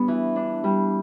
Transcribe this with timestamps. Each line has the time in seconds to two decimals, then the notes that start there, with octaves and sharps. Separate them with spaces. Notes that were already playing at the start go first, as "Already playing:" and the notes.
Already playing: G3 B3 D4
0.08 E3
0.36 D4
0.64 G3